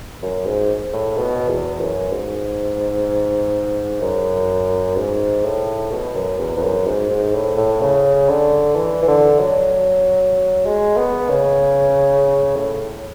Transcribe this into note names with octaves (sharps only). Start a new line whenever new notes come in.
F#2
G#2
A2
B2
E2
F#2
G#2
F#2
G#2
A2
B2
F#2
E2
E2
F#2
G#2
G#2
A2
A2
C#3
D3
E3
E3
D3
F#3
G#3
B3
C#3
A2